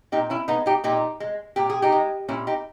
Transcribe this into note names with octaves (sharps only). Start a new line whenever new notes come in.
A#2 D#4 G4
C#4 E4
G#3 B3 D#4
D#4 G4
A#2 D#4 G4
G#3
A#2 G4
G#4
D#4 G4
G#3
A#2 C#4 E4
D#4 G4